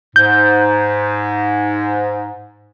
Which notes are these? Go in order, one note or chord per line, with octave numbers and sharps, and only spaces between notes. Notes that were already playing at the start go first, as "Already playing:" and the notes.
G#2 G6